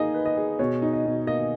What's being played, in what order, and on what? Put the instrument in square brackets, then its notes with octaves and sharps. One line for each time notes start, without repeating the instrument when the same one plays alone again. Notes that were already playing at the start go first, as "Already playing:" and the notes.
Already playing: [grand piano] A#3 D#4 G#4 [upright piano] D#5
[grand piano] B4
[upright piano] D#5
[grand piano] G#4
[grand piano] B2 [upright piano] C#5
[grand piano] D#4
[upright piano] D#5
[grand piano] B2
[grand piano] A#3 [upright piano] D#5